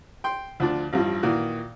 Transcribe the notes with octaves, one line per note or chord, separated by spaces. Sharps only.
G5 C6
D2 F3 D4
A1 G2 F3
A#2 D#3 E3 F#4